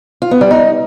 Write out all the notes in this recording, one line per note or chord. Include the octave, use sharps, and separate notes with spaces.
F4
B3
G3
D#4